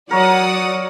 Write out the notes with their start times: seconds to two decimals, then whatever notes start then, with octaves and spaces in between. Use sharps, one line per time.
0.11 F#3 A#4 C#5 D5 E5 F#5 D#6